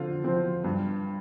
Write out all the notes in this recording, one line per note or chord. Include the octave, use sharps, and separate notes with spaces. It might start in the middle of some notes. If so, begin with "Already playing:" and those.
Already playing: D3 F3 C4 F4
F3 C4
G2